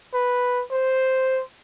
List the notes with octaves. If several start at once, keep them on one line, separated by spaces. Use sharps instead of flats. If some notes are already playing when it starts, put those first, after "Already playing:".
B4
C5